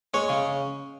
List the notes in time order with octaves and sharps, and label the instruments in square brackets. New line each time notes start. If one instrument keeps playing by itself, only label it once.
[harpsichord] G#3 C#5
C#3